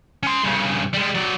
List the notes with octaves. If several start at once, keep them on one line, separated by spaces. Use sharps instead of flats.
C#4 C6
G2 C#3
G3 G#3
F#3 D5